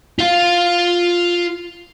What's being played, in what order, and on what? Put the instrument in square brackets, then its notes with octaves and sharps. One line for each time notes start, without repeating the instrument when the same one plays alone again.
[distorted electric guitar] F4 F5